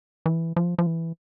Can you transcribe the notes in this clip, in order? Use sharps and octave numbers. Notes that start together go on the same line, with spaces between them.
E3
F3
F3
E3